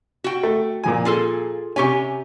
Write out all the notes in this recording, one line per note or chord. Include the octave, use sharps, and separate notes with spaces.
F#4 G5
A3
A#2 F3 G#5
F4 G#4 A4
C3 C#4 G4 G#5 C#6